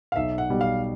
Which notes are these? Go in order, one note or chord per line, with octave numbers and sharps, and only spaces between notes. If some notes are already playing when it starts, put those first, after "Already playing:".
F5
B1 E5
F#5
B2 G3
F5